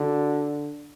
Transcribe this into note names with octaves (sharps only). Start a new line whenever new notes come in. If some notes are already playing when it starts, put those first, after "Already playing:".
Already playing: D3 F#4